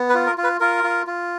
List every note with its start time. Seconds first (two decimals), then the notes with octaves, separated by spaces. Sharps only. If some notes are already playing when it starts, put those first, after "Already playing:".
Already playing: B3
0.09 B4
0.14 F4
0.26 A#4
0.38 F4
0.44 B4
0.60 F4 A#4
0.84 F4
1.07 F4